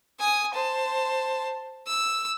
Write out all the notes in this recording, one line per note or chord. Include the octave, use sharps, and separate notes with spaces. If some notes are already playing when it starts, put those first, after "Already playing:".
G#5 D#6
C5 A5
E6